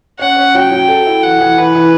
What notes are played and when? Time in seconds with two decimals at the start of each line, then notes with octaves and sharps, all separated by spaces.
0.19 C#4 F#5
0.37 C#4
0.54 F#3 G5
0.71 F#3
0.88 A4
1.07 E4
1.23 E3 F#5
1.41 E3
1.57 E3 B4
1.75 E3